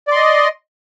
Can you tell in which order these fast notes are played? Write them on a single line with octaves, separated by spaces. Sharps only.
D5 C6 D#5